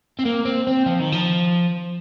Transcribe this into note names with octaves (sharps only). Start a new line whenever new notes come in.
C4
A#3
C4
C4
F3
D#3
F3